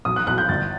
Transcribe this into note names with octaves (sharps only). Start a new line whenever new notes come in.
B1 D#6
F#6
B1 F#6
G6
G1 A6